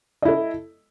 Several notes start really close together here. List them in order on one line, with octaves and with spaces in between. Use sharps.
D#5 E4 A4